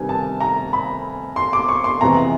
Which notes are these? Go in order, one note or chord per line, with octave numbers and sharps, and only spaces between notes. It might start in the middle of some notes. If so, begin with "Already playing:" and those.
Already playing: D2 C3 D#3 G3 B3 G#5
A5
A#5
B5
C6
D6
C#6
C6
F2 C3 E3 G#3 B3 A#5